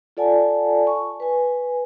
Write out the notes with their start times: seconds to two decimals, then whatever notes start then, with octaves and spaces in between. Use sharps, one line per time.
0.17 F4 A4 D5 F#5 G#5 A5
0.87 G#5 C#6
1.20 B4 G#5